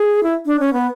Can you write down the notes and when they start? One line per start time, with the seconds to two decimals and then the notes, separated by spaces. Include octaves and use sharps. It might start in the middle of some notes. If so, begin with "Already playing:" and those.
Already playing: G#4
0.23 E4
0.46 D4
0.60 C#4
0.73 B3